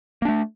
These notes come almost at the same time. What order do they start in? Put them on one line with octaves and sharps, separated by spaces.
A#3 D4 A3